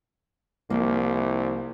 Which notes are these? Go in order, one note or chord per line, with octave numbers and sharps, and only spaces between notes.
C2 F3 A#3